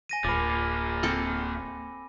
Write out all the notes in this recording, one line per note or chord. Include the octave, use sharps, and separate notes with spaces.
G#5 A#6 D#7
D1 F3 A#3 B5 D6
C4 A4